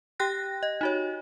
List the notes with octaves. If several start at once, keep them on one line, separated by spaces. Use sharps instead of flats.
G4 G5 F#6 A#6
D#5
D#4 F#4 C#5